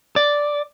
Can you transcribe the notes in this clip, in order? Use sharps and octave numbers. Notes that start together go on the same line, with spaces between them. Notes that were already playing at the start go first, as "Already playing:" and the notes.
D5